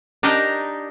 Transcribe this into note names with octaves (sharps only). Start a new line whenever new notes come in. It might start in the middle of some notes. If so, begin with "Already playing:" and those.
D4 D#4 G4 A#4 D#5